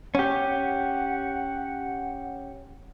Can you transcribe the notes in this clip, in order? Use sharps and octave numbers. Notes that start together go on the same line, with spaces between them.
C#4 G4 F#5